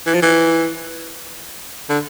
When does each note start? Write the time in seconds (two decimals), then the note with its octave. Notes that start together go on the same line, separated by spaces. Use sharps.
0.07 E3
0.14 F3
0.22 E3
1.89 D3